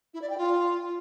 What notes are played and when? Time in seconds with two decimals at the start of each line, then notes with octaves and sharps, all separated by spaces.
0.14 E4
0.22 D5
0.30 G5
0.38 F4